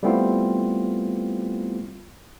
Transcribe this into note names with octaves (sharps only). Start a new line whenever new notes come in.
G3 A3 B3 C4 E4 F4